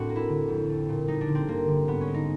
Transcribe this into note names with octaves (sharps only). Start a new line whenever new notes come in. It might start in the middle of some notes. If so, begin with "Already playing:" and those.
Already playing: A2 C4 D4 F#4
A#3
E4
D3
F2
A3
A#2
G3 D#4
D4
D3
C4
G2 A#3
D3
G#2 B3
C#4
G#3
D#4